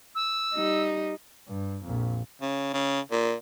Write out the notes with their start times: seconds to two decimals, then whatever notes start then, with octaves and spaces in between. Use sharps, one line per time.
0.15 E6
0.54 G3 D#4
1.48 G2
1.83 A#1 F2
2.41 C#3
2.73 C#3
3.12 A#2